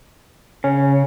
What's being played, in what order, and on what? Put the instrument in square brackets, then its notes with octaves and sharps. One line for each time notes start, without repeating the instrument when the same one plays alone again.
[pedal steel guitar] C#3 [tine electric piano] C#4